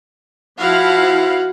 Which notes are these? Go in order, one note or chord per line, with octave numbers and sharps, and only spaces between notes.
F3 E4 F#4 F5